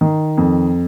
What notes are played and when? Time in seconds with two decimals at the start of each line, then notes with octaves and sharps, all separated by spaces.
0.01 D#3
0.38 F2